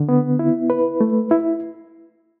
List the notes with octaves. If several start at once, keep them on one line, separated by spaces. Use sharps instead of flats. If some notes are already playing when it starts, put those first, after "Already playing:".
Already playing: D3
B3
E4
B4
A3
E4